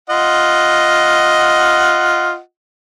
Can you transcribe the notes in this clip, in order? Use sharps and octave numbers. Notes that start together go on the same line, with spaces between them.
F4 D#5 F#5